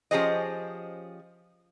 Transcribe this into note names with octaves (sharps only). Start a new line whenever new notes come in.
F3 C#4 G4 G#4 C5 D#5